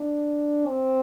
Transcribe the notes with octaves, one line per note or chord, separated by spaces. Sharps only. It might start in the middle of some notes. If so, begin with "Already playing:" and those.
Already playing: D4
C4